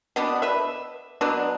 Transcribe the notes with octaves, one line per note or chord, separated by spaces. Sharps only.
B2 B3 D4
B4 E5
B2 F#3 B3 D4